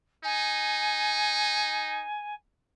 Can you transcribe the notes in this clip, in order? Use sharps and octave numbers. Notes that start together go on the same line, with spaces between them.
D#4 G#5